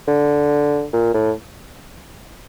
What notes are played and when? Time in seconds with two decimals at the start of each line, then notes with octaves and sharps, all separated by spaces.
0.08 D3
0.93 A#2
1.14 A2